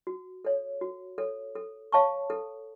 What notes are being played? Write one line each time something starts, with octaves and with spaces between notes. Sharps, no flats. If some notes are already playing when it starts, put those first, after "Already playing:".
F#4
A4 C#5
F#4
A4 C#5
A4
C#5 F5 A5 C#6
A4